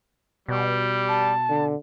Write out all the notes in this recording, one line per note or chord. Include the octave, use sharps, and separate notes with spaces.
B2 G3
A5
D3